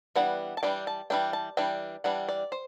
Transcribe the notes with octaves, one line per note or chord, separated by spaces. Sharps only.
E3 G3 B3 D4 F#5
A5
E3 G3 D4 G5
A5
E3 G3 D4 G5
A5
E3 G3 D4 G5
E3 G3 D4 F#5
D5
C5